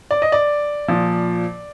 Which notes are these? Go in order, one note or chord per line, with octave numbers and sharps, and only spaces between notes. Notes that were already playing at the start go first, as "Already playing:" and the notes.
D5
D#5
D5
A#2 F3